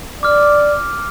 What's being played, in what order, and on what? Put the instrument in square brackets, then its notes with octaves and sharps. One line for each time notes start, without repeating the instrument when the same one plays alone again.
[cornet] D5 [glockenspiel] D6 F6